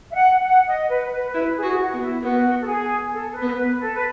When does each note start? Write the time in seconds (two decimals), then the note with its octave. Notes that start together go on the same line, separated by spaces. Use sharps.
0.11 E5
0.14 F#5
0.44 F#5
0.67 D#5
0.89 B4
1.12 B4
1.34 E4 B4
1.56 G#4
1.63 F#4
1.79 F#4
1.93 B3
2.00 E4
2.23 B3 F#4
2.61 A4
2.67 G#4
3.12 A4
3.34 B4
3.42 B3
3.56 B4
3.79 A4
3.95 B4